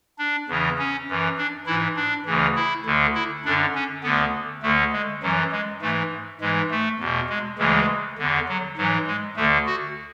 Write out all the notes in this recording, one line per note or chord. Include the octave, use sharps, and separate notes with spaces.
D4
E2 C#3 E3
C#4
F#2 E3
D4
G#2 E3 E4
D4
D2 C#3 E3
E4
D2 D3
E4
F#2 D3 D4
C#4
D2 D3 B3
D2 D3 A3
G#3
F#2 E3 F#3
G#3
G#2 E3 A3
G#2 E3 G#3
A3
E2 B2
G#3
D2 C#3 E3 G#3
E2 D3
F#3
G#2 E3 F#3
G#3
D2 D3 A3
F#4